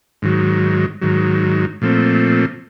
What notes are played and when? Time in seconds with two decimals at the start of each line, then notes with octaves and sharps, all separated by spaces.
0.22 G#2 D#3 F#3
1.01 G#2 D#3 F#3
1.82 A#2 F3 A3 C4